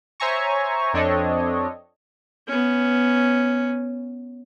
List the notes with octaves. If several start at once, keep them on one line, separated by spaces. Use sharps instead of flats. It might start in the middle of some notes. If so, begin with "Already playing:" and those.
C5 C#5 E5 G#5 A#5 C#6
F2 C4 D4 A4 C#5 D#5
B3 C#4